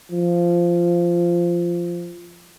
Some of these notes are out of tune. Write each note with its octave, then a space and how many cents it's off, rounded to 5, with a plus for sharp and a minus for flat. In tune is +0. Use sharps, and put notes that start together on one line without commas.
F3 -10